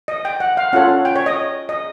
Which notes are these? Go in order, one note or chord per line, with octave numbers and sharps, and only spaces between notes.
D#5
G5
F#5
F5
C#4 F4 A4 C#5 F#5
G5
C#5
D#5
D#5